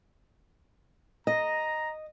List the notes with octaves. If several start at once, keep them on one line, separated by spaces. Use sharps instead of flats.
D#5 A#5